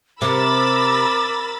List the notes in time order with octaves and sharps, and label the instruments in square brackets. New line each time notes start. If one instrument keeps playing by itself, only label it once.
[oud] C3 [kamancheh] A#4 [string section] B5 E6 A6 [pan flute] D6